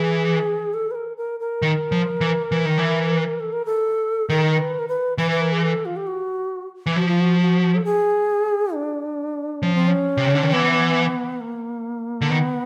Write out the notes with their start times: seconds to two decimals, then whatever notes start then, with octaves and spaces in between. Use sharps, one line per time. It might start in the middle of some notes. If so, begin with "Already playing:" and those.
Already playing: E3 G#4
0.74 A4
0.91 B4
0.95 A#4
1.17 A#4
1.40 A#4
1.62 D#3
1.92 F3
2.21 E3
2.52 E3
2.65 D#3
2.78 E3
3.40 A4
3.53 A#4
3.66 A4
4.29 D#3 A#4
4.58 B4
4.79 A#4
4.88 B4
5.18 E3 B4
5.31 B4
5.41 A#4
5.52 G#4
5.63 A4
5.85 F4
5.96 G4
6.07 F#4
6.86 E3
6.96 F3 F#4
7.08 F4
7.21 F#4
7.41 F#4
7.75 A4
7.85 G#4
8.74 D4
9.62 F3 C#4
9.75 C4
9.88 C#4
10.17 C3
10.27 C#3
10.35 D3
10.43 D#3
10.52 E3 B3
11.41 A#3
12.21 D3
12.30 D#3 B3